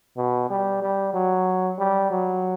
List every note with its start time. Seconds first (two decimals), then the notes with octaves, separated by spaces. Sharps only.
0.17 B2
0.50 G3
0.82 G3
1.14 F#3
1.79 G3
2.11 F#3